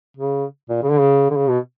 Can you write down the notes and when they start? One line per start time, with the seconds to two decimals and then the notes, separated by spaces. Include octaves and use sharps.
0.17 C#3
0.69 A#2
0.83 C#3
0.91 D3
1.00 C#3
1.30 D3
1.36 C#3
1.49 B2